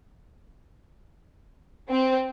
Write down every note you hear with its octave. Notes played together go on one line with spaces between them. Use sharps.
C4